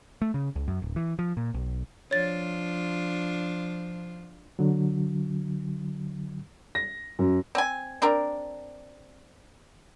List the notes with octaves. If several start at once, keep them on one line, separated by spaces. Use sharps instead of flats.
A3
C#3
C#2
F#2
D1
E3
F3
A#2
B1
F3 D4 F4 C#5 A6
D3 F#3
A#6
F#2
C4 G#5
C4 D4 A#4